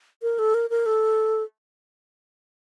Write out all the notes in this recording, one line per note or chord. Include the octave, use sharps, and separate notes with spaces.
A#4
A4
A#4
A#4
A4